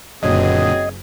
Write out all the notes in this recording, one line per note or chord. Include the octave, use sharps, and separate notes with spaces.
F#1 F#2 A#2 D3 F#3 C4 G#4 D#5